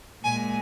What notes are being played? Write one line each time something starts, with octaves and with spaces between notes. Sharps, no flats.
A#2 G#3 G#5